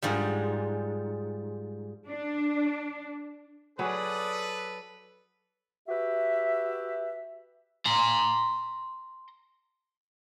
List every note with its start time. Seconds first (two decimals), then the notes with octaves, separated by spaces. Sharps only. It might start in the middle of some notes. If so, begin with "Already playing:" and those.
0.02 G#2 F3 G3
2.08 D4
3.79 F#3 G#4 A4 B4 D5 D#6
5.88 F#4 G4 B4 E5
7.86 A#5 C6